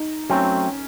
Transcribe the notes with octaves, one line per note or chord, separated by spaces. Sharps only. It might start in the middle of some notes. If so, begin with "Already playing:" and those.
Already playing: D#4
F#3 A3 C4 C#4